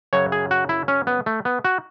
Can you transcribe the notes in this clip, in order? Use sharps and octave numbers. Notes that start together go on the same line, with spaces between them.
F#2 C#3 F#3 C#5
G#4
F#4
E4
C#4
B3
A3
B3
F#4